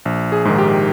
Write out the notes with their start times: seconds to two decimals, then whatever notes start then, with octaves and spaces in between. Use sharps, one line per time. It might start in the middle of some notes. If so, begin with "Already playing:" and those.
0.05 A#1
0.32 G#4
0.45 G#2 D#3
0.58 G4